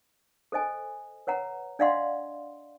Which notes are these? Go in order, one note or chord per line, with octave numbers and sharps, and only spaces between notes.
A4 C5 D#5 G#5
B4 C#5 F#5 A#5
D4 D5 D#5 F5 F#5 C6